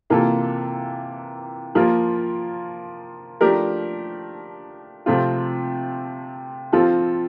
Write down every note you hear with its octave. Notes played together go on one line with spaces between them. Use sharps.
C3 E3 A#3 F4 A4
F3 A#3 F4 A#4
F3 A3 D4 G4 A#4
C3 F3 A3 C4 F4
F3 C4 F4 A4